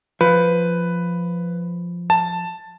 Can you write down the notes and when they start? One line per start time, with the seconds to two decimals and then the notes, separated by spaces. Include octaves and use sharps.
0.21 F3 B4
2.10 A5